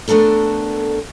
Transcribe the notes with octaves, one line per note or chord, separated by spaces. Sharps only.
A3 B3 D4 A4 A#4